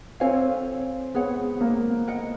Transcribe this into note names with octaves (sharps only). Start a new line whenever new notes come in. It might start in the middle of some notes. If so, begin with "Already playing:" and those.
C4 A4 C#5 F5 G#5
B3 G#4 C#5 F#5
A#3
A#4 D#5 F#5